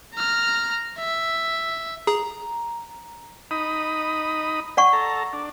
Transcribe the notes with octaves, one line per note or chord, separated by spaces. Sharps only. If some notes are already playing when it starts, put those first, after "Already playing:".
A#5 F6
E5
G#4 A#5
D#4 B5 D#6
D5 F#5 C#6
A4 A#5
D4